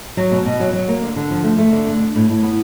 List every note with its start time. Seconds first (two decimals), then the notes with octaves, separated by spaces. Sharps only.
0.17 F#3
0.32 B2
0.46 B2
0.60 F#3
0.73 F#3
0.88 A#3
1.01 D3
1.16 D3
1.31 F3
1.44 A3
1.58 A3
1.72 D3
1.87 D4
2.00 D4
2.15 A2
2.30 A2
2.43 B3